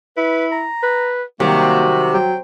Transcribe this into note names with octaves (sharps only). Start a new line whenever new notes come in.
E4 B4
A#5
B4
C3 D#3 F#3 G3 A#3 F#4
F#3 G5